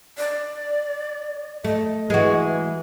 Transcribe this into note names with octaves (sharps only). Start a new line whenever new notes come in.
D5
A3 D#5
E3 G#3 F#4